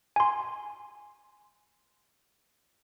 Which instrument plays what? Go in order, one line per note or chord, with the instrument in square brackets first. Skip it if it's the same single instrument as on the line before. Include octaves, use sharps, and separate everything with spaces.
[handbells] G#5 C6